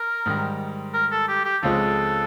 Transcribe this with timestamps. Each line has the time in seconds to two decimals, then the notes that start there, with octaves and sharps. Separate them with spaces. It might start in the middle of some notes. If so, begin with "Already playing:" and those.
Already playing: A#4
0.26 G#2 D#3 G3
0.94 A#4
1.11 A4
1.28 G4
1.45 G4
1.63 C#2 C#3 F3 G#3 C4 A4